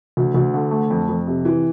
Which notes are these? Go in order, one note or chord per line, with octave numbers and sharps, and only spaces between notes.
D2
D2
D3
A3
F2
F2
C3
E3